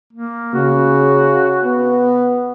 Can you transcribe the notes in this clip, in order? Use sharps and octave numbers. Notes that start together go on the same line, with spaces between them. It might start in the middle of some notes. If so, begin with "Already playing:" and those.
A#3
C#3 F#4
B3